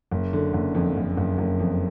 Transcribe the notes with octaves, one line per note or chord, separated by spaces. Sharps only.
F#1
D3
F#1
F2
F#1
F#1
F#1
F2